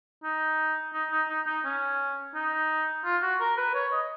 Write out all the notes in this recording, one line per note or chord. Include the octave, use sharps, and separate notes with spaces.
D#4
D#4
D#4
D#4
D#4
C#4
D#4
F4
F#4
A#4
B4
C#5
D#5